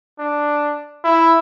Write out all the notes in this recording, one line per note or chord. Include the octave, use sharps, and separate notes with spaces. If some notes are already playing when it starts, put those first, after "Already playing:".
D4
E4